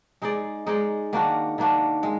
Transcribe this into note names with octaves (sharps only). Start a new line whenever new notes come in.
G#3 D#4 G#4 D5
G#3 D#4 G#4 D5
D#3 A#3 D4 F#4
D#3 A#3 D4 F#4
G#3